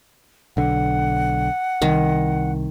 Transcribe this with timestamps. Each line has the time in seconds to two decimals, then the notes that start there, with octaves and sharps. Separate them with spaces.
0.57 B1 D3 F#5
1.82 C2 D#3